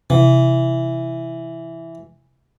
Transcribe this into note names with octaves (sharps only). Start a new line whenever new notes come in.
C3 E3